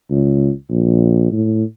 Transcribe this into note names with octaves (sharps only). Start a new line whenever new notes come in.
C#2
A#1
A2